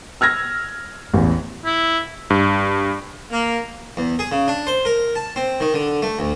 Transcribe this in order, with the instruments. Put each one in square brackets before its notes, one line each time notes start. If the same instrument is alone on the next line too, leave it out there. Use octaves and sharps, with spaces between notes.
[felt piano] E6 F6 G#6 A#6
A1 E2
[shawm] E4
[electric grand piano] G2
[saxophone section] A#3
[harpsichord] E2
G#4
C#3
D4
C5
A#4
A5
C4
D#3
D3
A3
D2